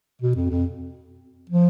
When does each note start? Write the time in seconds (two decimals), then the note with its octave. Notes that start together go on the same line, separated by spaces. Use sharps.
0.22 B2
0.35 F2
0.50 F2
1.50 F3